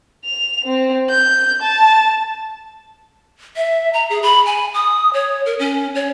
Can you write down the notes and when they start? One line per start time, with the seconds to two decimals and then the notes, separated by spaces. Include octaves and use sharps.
0.25 F7
0.64 C4
1.10 G6
1.62 A5
3.56 E5
3.93 A#5
4.10 G#4
4.23 B5
4.46 G#5
4.74 D#6
5.13 C#5
5.46 A#4
5.59 C#4
5.95 C#5